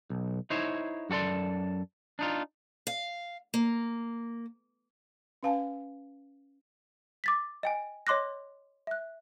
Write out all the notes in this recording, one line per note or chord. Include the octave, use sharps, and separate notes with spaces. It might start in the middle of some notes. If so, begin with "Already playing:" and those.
B1
D#4 E4 C5 C#5
F#2 F#4 A4 D5 C6
D4 D#4 F4
F5
A#3
C#4 B4 F5 G#5 A5
D6 A6 B6
D#5 G5 G#5
C#5 D#5 C6 D6 F#6 A#6
E5 F#6